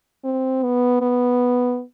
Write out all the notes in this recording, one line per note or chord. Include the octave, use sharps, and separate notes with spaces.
C4
B3
B3